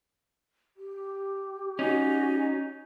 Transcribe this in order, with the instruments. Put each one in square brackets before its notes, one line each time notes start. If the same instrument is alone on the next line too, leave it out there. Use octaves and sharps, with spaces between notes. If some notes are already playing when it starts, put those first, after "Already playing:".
[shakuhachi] G4
[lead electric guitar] C#4 D#4 [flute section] F#4 D#5 G#5